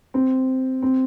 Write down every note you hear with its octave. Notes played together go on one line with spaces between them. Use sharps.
C4
C4